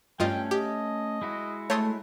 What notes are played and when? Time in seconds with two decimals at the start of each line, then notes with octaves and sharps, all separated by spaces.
0.20 G2 A3 C#4 F4 D#5 G5
0.51 G4 D#5
1.22 G#3 E4 F#4
1.70 A3 C#5 C6 D#6